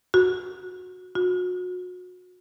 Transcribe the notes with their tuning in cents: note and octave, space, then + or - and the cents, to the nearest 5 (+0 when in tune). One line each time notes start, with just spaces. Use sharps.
F#4 -10
F#4 -35